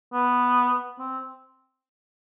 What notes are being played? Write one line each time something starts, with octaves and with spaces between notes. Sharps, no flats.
B3
C4